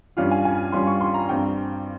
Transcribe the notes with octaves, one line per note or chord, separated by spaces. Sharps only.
G2 G3 C#4 F4 F5
G#5
G#5
G2 G3 C#4 F4 C6
C#6
C6
A#5
G2 G3 C4 G5